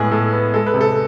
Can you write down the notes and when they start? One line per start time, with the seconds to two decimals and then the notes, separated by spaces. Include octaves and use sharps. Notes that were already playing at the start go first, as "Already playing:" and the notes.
Already playing: A2 G#3 B3 G#4
0.11 A2 A4
0.33 B3
0.54 G#3 A4
0.66 B4
0.74 C3
0.81 A4